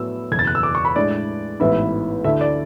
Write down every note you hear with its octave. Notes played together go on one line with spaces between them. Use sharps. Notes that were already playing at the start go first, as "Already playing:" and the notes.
Already playing: A2 F#3 B3 E4 E6
F#1 E2 B2 G#6
A6
F#6
E6
D6
C#6
B5
A2 G#3 D4 D5
A1 G#2 E3 B3 E4 E5
D2 D3 A3 E4 E5
D5